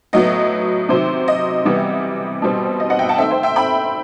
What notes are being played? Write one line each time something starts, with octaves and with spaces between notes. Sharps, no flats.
A2 F#3 B3 D#5
C3 D#3 F#3 C5
D#5
C3 E3 G3 B3
B2 G3 C4
D#5
D#5 F#5
E5 G5
F#5 A5
D#3 A3 C4 E5 G5
C5 E5
E5 G5
G5 B5